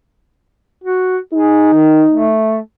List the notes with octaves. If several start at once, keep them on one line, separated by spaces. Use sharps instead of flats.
F#4
D#4 G#4
D#3
A3